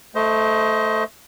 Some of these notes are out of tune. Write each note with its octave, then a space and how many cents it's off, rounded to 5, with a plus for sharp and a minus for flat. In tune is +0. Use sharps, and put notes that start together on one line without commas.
A3 +0 C5 -15 D#5 +25